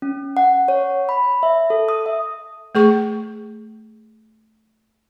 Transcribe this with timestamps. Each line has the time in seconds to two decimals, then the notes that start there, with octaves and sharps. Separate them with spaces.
0.02 C#4
0.37 F#5
0.68 C#5
1.09 B5
1.43 E5
1.70 A4
1.89 D#6
2.06 E5
2.75 A3 G#4 C#6